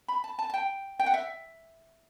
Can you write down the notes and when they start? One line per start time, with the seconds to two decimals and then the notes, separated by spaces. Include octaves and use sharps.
0.08 B5
0.24 A5
0.39 A5
0.50 A5
0.54 G5
0.99 G5
1.06 F#5
1.14 E5